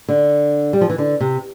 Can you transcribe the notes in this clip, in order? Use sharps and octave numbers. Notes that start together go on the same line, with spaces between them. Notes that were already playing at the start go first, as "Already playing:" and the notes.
D3
G3
F3
E3
D3
C3